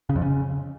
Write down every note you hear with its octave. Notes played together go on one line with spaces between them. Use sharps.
C#3
F2
C#3